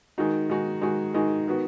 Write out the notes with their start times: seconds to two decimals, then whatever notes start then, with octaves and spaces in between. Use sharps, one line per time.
0.18 D#3 G#3 D#4 F#4
0.50 D#3 G#3 D#4 F#4
0.82 D#3 G#3 D#4 F#4
1.14 D#3 G#3 D#4 F#4
1.48 D#3 B3 F#4